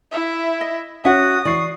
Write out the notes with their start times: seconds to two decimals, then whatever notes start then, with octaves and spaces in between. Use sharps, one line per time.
0.12 E4 E5
0.61 D#5
1.05 C#4 F#4 E5 F#5 D#6
1.45 E3 D5 C#6 C7